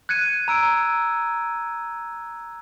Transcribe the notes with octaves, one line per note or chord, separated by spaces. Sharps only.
F#6 G#6 C#7 D#7
A#5 E6 D7